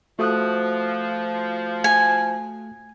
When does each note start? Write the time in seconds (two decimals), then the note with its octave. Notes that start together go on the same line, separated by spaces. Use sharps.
0.19 F3 A3 F#4 D#6 F#6
1.84 G#5